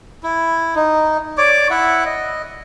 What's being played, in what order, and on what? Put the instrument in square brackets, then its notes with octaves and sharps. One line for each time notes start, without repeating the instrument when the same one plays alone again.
[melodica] E4
D#4
C#5 D5 D6
E4 E5 F#5
D#5